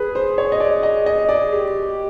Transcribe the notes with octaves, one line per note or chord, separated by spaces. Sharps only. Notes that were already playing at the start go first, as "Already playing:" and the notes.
Already playing: G#4 B4
C5
C#5
D#5
D5
D#5
D#5
D5
G4